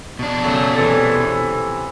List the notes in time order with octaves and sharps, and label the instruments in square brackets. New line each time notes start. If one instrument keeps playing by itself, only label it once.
[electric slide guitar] B2 D4
[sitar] C#3 F#3 A3
[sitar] C3 E3 [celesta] A4 A6 C#7